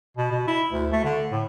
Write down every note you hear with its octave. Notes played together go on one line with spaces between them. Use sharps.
B2
B2
E4
D2
A3
D3
A2